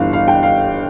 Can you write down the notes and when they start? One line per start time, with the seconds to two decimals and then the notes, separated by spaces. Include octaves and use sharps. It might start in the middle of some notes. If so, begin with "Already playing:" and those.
Already playing: G1 G2 E3 F5
0.13 F5
0.28 G5
0.43 F5